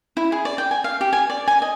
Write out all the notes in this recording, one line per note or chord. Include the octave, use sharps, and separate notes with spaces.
E4
G#4
D5
G5
G#5
F5
G4
G#5
D5
G#5
D#5